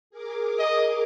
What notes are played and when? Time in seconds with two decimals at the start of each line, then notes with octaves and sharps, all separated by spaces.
0.10 G#4 A#4 D6
0.59 D#5